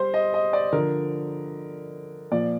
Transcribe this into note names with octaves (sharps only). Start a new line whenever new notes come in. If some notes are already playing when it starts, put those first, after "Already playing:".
Already playing: G3 C5
D#5
D#5
D5
D3 F3 A#4
A#2 F3 D5